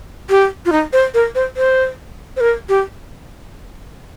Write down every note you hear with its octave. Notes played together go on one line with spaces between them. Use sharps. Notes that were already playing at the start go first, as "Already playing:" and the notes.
G4
F4
D#4
C5
A#4
C5
C5
C5
A#4
G4